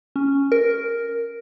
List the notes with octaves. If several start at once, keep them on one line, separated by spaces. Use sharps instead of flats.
C#4
A#4